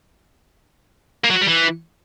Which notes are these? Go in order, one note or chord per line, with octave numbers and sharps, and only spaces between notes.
A#3
F#3
F#4
G3
E3